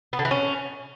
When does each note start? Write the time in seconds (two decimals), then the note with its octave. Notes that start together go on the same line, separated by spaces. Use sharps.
0.13 B3
0.19 D3
0.25 E3
0.31 C#4